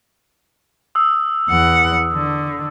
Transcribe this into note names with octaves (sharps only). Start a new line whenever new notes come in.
D#6 E6
E2 F#5
D3